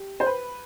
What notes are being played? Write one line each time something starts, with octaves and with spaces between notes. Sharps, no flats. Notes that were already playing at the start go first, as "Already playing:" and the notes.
Already playing: G4
C5
B4